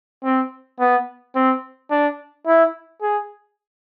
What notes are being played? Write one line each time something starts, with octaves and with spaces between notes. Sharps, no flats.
C4
B3
C4
D4
E4
G#4